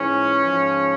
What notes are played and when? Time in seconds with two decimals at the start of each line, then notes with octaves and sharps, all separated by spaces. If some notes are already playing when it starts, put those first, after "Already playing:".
Already playing: G#2 E3 C#4
0.42 G#2 F3